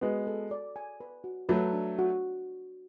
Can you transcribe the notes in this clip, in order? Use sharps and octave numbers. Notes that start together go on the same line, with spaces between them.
G#3 B3 F#4
A4
D5
G#5
B4
F#4
F#3 A3 B4
D4
F#4